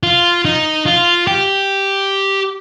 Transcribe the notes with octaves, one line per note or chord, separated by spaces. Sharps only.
F4
D#4
F4
G4